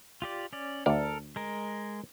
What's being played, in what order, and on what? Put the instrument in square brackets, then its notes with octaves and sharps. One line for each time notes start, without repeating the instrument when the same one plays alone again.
[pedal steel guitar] F4 G4 D5
C#4 D5
[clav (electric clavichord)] D2 D5 [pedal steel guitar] A4 A#4
[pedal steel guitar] G#3 A#4